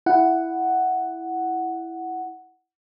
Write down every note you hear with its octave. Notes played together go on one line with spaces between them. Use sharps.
E4 F#5